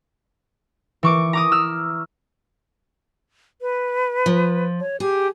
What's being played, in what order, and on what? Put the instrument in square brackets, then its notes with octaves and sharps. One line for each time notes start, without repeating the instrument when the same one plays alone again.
[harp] E3 C#6 D6
A#5 D6 D#6
E6 F6
[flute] B4
[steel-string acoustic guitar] F3
[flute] C#5
[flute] G4 [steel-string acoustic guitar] G#4